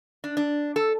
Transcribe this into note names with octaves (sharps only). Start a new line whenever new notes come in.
D4
D4
A4